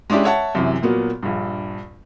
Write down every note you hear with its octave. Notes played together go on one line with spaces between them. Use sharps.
G#3 C#4 D4 E4 G4
C#5 E5 F#5 A5
F#2 C3 E3
A#2 F#3 A#3 B3
A#1 G2